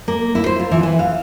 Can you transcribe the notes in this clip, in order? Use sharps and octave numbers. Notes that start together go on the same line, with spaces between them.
A#3
E4
C5
F4
E3
E3
F5